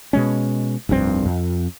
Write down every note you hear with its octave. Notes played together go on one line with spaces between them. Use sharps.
B2 G#3 C#4
F1 C2 G2 C4
F2